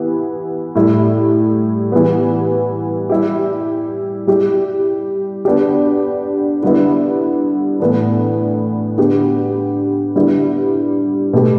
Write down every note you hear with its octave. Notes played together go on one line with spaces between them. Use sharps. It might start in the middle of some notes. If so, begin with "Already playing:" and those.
Already playing: E3 B3 E4 G4
A2 G3 E4
E3 G3 B3
G3 E4 G4
G3 E4 G4
D3 B3 D4 G4
D3 G3 B3 E4
A2 E3 B3 D4
D3 B3 G4
D3 G3 B3 E4
B2 A3 G4